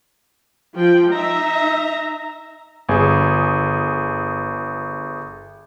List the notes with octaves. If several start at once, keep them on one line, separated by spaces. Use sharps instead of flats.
F3 G5
D#4 E5 A#5
G1 G#4